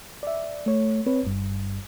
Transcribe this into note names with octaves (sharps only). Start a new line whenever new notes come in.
D5 E5
A3 C#5
C4 B4 C#5
G1 G2